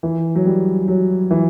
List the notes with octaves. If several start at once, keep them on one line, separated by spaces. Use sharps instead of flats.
E3
F#3
G3
F#3
E3